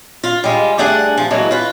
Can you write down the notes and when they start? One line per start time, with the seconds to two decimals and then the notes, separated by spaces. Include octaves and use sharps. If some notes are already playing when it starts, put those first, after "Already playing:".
0.24 F4
0.44 G3 G#3 F4
0.78 G2 A3 D4 G#4 F#5
1.18 F3
1.31 E3 F#3 G#3 A#3 D4 F#4
1.51 F4 B4